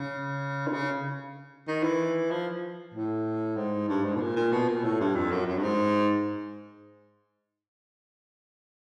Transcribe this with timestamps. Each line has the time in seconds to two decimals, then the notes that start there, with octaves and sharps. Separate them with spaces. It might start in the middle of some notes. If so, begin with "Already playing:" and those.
Already playing: C#3
0.67 D3
0.73 C#3
1.68 D#3
1.83 E3
2.31 F3
2.94 A2
3.57 G#2
3.89 G2
4.04 G#2
4.16 B2
4.21 A#2
4.36 A#2
4.52 B2
4.68 A#2
4.84 A2
5.00 G2
5.15 F2
5.32 F#2
5.47 F#2
5.58 G2
5.63 G#2